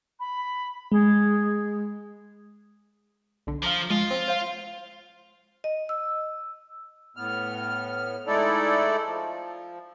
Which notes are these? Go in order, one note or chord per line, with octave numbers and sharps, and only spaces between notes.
B5
G#3 G#4
B1 D3
F3 F5 A#5 D6
F3 G#3 F4
C4
C5 F5
D#5
E6
A2 B3 F6
G#3 A3 D#4 E4 A4 D5
F3